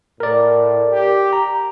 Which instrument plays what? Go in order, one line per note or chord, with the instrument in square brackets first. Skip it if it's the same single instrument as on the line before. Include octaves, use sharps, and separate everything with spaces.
[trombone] A2 [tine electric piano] A#4 D5
[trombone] G4
[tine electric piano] A#5